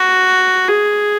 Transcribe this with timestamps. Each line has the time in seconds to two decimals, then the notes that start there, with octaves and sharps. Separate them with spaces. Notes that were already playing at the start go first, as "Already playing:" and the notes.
Already playing: F#4
0.68 G#4